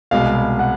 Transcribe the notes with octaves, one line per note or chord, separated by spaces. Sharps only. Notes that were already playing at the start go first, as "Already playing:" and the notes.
C2 B2 G#3 F5
F#5